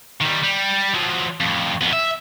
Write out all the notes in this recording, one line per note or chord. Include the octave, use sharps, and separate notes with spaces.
D#3 G3
G3
F3 F#3
F2 A2
F2 B3
E5